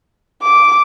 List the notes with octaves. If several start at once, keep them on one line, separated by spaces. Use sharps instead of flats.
D6